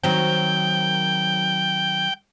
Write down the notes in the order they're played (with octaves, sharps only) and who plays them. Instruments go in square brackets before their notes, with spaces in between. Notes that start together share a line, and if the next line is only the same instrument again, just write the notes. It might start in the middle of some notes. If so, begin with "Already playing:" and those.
[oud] D#3 F#3 C4 [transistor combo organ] G5